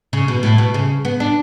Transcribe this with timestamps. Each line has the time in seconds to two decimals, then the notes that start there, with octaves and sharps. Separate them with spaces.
0.13 C#3
0.28 B2
0.43 A2
0.58 B2
0.74 C#3
1.05 B3
1.20 D4